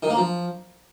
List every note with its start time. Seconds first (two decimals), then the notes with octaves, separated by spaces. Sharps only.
0.03 D#3
0.10 A#3
0.17 F3